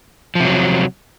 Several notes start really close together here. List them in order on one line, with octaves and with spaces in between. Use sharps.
F3 C3 F#3